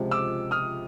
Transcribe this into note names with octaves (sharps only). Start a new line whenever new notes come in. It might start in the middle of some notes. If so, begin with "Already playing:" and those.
Already playing: C#2 C3 F3 G#3
D6 E6
D#6 F6